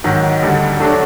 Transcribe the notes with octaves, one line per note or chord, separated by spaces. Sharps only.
G#2 D#3 F#3
D2 D3 G3
D3 F#3 A3 D4 F#4